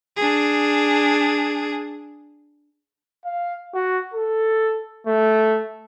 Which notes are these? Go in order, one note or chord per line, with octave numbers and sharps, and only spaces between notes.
D4 G#4
F5
F#4
A4
A3